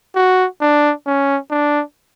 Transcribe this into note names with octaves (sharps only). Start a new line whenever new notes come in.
F#4
D4
C#4
D4